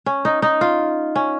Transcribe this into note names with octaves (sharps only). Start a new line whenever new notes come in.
C#4
D#4
D#4
F4
C#4